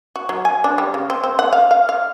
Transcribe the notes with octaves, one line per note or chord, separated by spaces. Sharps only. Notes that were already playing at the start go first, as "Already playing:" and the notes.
F#4
F#3
G#5
D4
G3
C#3
C4
C4
F#5
F5
F5
F5